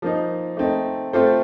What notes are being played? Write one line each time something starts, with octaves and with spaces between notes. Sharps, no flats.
F3 A#3 D#4
A3 C4 D#4
A3 C4 F4 A4 C5